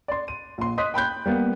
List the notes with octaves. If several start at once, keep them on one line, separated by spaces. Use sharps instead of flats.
D5 C6
D#7
A#1 C6
D#5 C6 D#6 F#6 B6
G5 B5 F#6 G6
G3 A#3 B3